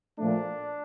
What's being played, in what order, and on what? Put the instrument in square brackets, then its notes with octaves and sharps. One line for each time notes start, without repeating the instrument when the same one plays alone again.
[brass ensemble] A#2 F3 A3 [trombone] D4